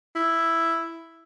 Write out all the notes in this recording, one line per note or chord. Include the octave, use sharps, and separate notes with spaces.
E4